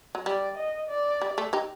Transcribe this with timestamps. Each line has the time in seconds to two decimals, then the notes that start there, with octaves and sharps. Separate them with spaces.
0.15 F#3
0.26 G3 D5
0.57 D#5
0.89 D5
1.21 G3
1.38 A3
1.53 D#4 G4